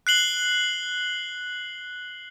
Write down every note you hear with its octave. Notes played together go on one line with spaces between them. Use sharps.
F#6 C7 F#7 G7